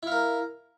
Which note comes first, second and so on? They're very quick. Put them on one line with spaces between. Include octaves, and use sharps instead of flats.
E4 F5 A#4